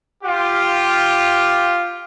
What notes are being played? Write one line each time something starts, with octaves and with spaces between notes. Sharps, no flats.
F4 G4